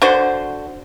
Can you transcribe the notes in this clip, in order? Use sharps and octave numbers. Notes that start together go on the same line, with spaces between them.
D3 F#4 C5